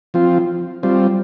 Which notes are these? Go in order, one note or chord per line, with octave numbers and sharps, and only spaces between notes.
F3 C4 F4
G3 C4 F4